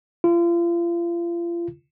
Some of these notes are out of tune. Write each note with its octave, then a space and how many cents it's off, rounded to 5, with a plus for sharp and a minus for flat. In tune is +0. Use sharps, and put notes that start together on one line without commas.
F4 -35